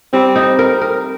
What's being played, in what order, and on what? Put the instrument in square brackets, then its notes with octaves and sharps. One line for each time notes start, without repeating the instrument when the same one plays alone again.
[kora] G3 [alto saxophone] C4
[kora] D#4
A#4
A#4